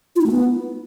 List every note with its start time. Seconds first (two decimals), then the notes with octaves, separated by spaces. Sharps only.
0.16 F4
0.21 D#4
0.26 A3
0.31 B3